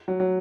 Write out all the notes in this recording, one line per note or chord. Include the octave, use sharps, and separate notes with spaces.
F#3
F#3